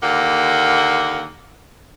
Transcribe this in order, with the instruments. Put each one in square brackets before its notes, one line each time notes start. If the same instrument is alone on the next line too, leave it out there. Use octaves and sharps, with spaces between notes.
[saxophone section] D#2 D3 A#3 F#5